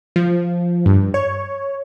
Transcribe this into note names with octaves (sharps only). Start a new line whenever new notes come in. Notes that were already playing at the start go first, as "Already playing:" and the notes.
F3
G2
C#5